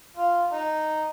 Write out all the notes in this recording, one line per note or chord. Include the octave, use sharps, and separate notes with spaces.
F4
D#4